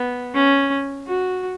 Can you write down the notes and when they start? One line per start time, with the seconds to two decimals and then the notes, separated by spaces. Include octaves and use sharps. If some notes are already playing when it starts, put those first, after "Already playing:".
Already playing: B3
0.35 C#4
1.07 F#4